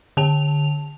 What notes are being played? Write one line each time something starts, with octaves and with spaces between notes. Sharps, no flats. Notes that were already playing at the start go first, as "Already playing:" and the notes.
D3 A5 F7